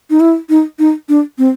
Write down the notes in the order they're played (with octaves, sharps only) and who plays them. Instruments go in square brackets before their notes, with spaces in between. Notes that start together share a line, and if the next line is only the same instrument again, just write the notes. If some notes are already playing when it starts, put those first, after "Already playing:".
[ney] D#4
E4
D#4
D#4
D4
C4